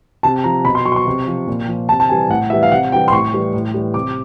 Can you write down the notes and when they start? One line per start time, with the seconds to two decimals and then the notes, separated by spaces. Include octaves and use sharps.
0.23 C3 A5
0.44 F3 A#5
0.65 B2 B5
0.75 C6
0.85 F#3 C#6
0.92 C6
0.96 C#6
1.07 C3
1.27 F3
1.47 A#2
1.68 F3
1.89 C3 A5
2.00 A5
2.09 E3 G3 G#5
2.29 A2 F#5
2.50 E3 E5
2.53 G3
2.63 F5
2.72 C3 F#5
2.92 E3 G5
2.96 G3
3.08 C6
3.12 A2 C#6
3.32 E3 G3
3.54 A2
3.74 E3 G3
3.94 C3 D6